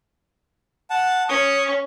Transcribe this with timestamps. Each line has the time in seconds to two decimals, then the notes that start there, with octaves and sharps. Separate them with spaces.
0.90 F#5 A5
1.29 C#4 C#6 D#6